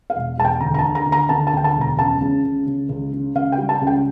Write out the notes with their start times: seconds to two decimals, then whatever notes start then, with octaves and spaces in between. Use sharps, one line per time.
0.10 F5
0.16 E1
0.38 E1 A5
0.44 G5
0.60 D2 A#5
0.74 A#5
0.79 A5
0.84 D3
0.95 A#5
1.06 D2
1.12 A#5
1.29 D2 A5
1.47 A5
1.53 D2 G5
1.64 A5
1.76 E1
1.81 A#5
1.98 C#2 A5
2.21 C#3
2.44 C#2
2.67 C#3
2.89 C#2
3.12 C#3
3.35 C#2 F5
3.52 G5
3.58 G3
3.69 A5
3.81 C#2
3.87 G5